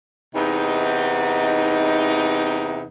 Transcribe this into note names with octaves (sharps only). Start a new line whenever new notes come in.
E2 C3 D#4